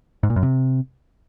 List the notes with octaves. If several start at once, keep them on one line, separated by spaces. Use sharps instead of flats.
G#2
A#2
F#2
C3